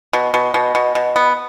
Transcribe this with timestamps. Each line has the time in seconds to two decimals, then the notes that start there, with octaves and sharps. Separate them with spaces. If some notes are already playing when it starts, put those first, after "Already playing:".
0.13 B2
0.34 B2
0.54 B2
0.75 B2
0.95 B2
1.16 B3